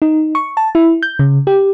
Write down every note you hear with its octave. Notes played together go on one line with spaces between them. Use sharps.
D#4
C#6
A5
E4
G6
C#3
G4